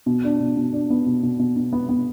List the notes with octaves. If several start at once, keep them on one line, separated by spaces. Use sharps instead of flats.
B2
D4
B2
B2
D4
B3
B2
B2
B2
B2
B3
B3